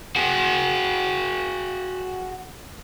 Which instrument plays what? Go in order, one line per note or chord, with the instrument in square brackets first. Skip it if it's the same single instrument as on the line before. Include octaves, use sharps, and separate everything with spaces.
[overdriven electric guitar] F#4 G#4